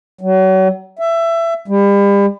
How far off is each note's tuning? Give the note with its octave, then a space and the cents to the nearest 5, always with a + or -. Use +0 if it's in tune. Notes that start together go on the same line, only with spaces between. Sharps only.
F#3 +35
E5 +20
G3 +35